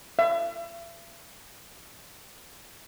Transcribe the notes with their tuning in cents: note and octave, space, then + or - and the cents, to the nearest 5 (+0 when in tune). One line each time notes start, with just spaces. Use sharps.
E5 +45